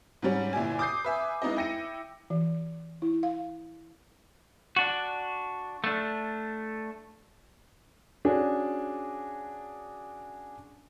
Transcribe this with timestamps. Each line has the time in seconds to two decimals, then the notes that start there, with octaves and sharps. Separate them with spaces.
0.22 G#2 F#3 G3 C#4
0.53 G1 A#2 E4 G4 D5 G#5
0.79 D6 D#6 G6 C7
1.04 B4 E5 G#5
1.42 G#3 B3 D#4 E4 D#5
1.56 E4 G5 A#6 C#7 D#7
2.30 E3
3.02 E4
3.23 F5
4.76 D4 F#4
5.84 A3 D4
8.25 C#4 D4 F#4 G#4